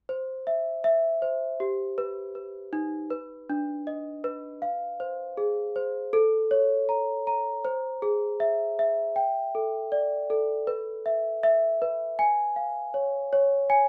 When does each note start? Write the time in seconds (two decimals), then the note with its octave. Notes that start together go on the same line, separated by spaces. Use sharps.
0.09 C5
0.47 E5
0.84 E5
1.22 C5
1.60 G4
1.98 B4
2.35 B4
2.73 D#4
3.10 B4
3.50 D4
3.87 D#5
4.24 B4
4.62 F5
5.00 C5
5.37 G#4
5.76 C5
6.13 A4
6.51 C#5
6.89 A#5
7.27 A#5
7.65 C5
8.02 G#4
8.40 E5
8.79 E5
9.16 G5
9.55 A4
9.92 D5
10.30 A4
10.67 B4
11.06 E5
11.43 E5
11.82 B4
12.19 G#5
12.56 F5
12.94 C#5
13.33 C#5
13.70 G#5